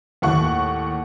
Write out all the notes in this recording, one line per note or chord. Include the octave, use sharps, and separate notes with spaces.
D#2 A2 F#5 C#6